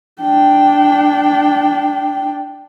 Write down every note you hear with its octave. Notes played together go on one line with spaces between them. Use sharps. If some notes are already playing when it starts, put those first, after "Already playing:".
D4 G5